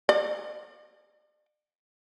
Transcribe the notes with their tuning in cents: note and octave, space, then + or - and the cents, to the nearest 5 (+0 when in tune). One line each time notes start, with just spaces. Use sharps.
D5 +40